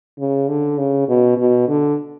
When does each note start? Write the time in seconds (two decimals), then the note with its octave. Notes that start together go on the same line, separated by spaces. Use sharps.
0.19 C#3
0.48 D3
0.78 C#3
1.09 B2
1.37 B2
1.68 D3